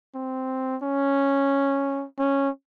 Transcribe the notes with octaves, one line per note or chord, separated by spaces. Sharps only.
C4
C#4
C#4